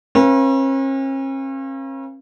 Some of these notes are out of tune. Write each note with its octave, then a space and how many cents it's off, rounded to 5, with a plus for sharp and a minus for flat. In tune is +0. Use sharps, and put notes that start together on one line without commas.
C#4 -45 B4 -45 F5 -20